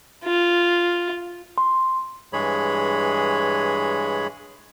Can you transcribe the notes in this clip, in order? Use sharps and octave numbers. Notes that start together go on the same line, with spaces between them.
F4
C6
G2 E3 G#3 G#4 C#5 B5